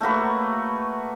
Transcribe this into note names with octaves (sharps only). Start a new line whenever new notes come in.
A3 A#3 F#4 B4